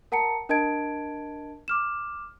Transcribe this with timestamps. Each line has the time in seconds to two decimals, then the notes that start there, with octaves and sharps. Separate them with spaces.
0.12 A#4 F#5 A5 A#5 C#7
0.49 D4 A#4 D#5 A5 G#6 D7
1.68 D6 F6 E7